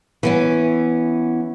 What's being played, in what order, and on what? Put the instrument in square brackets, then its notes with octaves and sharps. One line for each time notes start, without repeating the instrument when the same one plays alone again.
[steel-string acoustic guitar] E3 B3 C#4